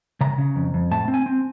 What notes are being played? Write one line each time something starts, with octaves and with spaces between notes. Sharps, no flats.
C#3 A#5
C#3
F2
F2
A2 A5
C4
G#5
C4